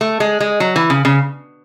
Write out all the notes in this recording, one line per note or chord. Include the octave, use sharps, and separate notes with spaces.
A3
G#3
G#3
F#3
E3
C#3
C#3